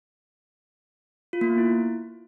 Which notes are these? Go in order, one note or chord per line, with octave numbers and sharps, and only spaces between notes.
F4
A#3
B3
E4